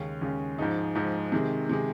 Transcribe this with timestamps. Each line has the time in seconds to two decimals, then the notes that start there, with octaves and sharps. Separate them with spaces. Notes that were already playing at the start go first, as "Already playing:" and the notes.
Already playing: D#2 C#3 G#3 C#4
0.21 D#2 C#3 G#3 C#4
0.58 G#2 F3 G#3 D#4
0.95 G#2 F3 G#3 D#4
1.32 C3 D#3 G#3
1.69 C3 D#3 G#3